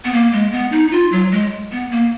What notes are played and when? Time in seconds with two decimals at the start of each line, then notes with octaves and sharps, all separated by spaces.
0.04 B3
0.13 A#3
0.33 G#3
0.52 B3
0.72 D#4
0.92 F4
1.12 F#3
1.32 G#3
1.72 B3
1.91 A#3